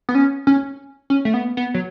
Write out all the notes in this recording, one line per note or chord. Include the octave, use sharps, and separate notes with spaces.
B3
C#4
C#4
C#4
A3
B3
B3
F#3